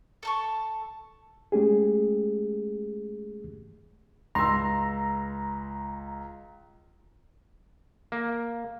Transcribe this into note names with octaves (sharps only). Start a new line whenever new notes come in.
A4 A5 C#6
G#3 A3 C#4 G4 G#4
C#2 A#5 C6 E6
A#3